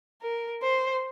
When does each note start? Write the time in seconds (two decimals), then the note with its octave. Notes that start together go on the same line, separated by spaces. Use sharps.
0.22 A#4
0.62 C5